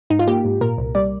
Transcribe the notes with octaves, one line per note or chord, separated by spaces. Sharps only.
G#2 D#4
F4
A#3 G4
G#2
A#2 A#4
C2
G3 D5